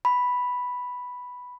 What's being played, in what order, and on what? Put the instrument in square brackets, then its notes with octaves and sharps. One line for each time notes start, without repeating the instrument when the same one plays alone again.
[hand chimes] B5